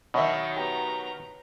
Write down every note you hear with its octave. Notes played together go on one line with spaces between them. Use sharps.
B2 D#3 F#3 D#5 E5
B3 G4 A#5